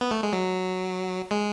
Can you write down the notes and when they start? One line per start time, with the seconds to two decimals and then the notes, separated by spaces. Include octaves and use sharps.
0.01 B3
0.11 A3
0.23 G#3
0.33 F#3
1.31 G#3